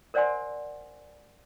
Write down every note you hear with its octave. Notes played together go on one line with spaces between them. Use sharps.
A#4 C5 D5 F#5 G#5 C6